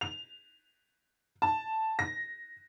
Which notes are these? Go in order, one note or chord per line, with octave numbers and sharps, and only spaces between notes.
F7
A5
A#6